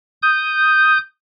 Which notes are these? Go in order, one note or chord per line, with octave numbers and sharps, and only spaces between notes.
D#6 G6